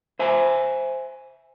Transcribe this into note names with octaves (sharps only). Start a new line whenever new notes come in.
C5 E5 G#5